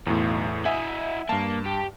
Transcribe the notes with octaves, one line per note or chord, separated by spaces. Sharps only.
B1 E2 A2
E4 D#5 E5 F#5 G#5
G2 A#3 A5
G4